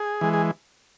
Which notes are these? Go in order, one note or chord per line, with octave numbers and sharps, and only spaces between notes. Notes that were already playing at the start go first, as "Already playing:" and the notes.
Already playing: G#4
E3 G#3
G#4